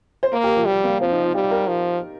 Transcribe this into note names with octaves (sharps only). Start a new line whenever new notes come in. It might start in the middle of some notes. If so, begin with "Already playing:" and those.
C5
A#3 A#4
G4
F3
F3 G3
A#3
F3 C4
D#4
F4
G3 G4
A#4
F3